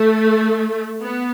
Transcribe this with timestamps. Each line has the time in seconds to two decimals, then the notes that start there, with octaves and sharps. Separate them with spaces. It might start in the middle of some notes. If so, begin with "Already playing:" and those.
Already playing: A3
1.00 B3